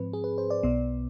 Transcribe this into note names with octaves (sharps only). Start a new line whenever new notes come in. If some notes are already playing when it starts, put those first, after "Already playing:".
Already playing: G#2 F3 C4 B4
G#4
B4
C5
D5
B1 B2 B3